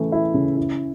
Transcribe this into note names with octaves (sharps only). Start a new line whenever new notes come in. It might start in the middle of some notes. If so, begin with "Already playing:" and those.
Already playing: C#3 E3 A3
E4
C#3
E4